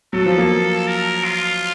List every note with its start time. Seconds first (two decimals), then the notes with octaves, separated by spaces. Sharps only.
0.13 F#3 A4
0.26 F3
0.38 A#3
0.87 A#4
1.25 F4